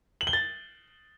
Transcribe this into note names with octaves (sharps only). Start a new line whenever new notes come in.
F#7
G7
A6